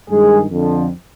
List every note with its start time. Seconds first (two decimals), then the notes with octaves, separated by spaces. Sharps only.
0.09 G2 D#3 G#3 G#4
0.49 F2 D3 F3